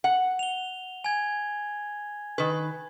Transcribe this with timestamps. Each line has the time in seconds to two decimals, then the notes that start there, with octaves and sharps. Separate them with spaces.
0.04 F#5
0.39 F7 G7
1.04 G#5 G#6
2.38 D#3 B4